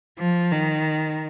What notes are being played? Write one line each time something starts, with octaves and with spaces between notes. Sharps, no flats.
F3
D#3